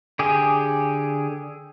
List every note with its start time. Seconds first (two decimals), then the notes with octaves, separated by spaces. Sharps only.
0.19 D3 G4 G#4